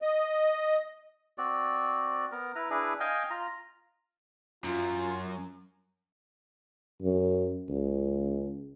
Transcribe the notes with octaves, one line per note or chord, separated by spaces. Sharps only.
D#5
C4 F#4 D5
B3 A#4
E4 B4 A#5
D4 E4 G#4 B4
D#5 F5 G5 G#5
F4 A#5
F#2 F4
F#2
C#2